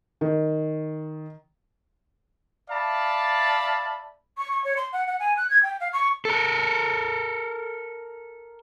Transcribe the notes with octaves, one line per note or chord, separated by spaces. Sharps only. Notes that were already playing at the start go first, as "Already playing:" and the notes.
D#3
D5 E5 F5 A5 B5
C#6
C#6
C#5
C6
F#5
F#5
G#5
F#6
G#6
G5
F5
C#6
A4 A#4